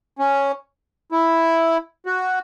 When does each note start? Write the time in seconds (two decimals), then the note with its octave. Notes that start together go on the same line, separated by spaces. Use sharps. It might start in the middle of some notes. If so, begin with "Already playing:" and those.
0.19 C#4
1.12 E4
2.06 F#4